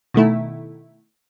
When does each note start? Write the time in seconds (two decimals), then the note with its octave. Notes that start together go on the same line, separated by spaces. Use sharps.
0.14 B2 D#3 A3 E4